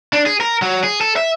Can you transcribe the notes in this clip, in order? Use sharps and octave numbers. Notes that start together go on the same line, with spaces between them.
D4
G#4
A#4
F#3
G#4
A4
E5